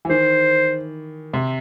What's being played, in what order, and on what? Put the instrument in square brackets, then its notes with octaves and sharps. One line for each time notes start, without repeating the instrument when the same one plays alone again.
[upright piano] E3
[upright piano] D#3 [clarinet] C5
[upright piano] C3